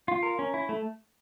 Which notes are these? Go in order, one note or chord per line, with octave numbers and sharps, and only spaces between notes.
F4
A#4
C#4
E4
A3